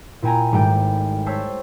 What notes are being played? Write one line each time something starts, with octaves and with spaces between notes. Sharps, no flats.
A#2 E4 G5 G#5 A#5
G#1 G#2 G3 A3 G5
C5 C#5 A5 E6 B6